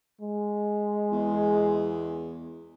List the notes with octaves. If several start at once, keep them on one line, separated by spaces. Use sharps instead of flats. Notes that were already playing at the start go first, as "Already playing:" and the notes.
G#3
E2